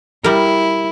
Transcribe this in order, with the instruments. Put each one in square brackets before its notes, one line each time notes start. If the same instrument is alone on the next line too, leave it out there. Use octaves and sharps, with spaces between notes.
[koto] G3 A#4 [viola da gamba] E4